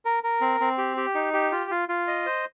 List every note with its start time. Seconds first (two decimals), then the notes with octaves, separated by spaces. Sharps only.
0.05 A#4
0.23 A#4
0.41 C4
0.60 C4
0.78 G4
0.97 G4
1.15 D#4
1.33 G4
1.52 F4
1.71 F4
1.89 F4
2.07 D#5
2.26 C5